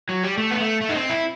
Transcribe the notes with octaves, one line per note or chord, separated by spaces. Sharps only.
F#3
G3
A3
B3
A3
A3
D#4
C4
E4